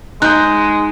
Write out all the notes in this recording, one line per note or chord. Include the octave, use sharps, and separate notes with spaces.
G#3 D#4 F#6 G6